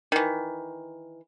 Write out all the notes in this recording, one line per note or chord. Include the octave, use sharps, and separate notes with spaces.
D#3 E3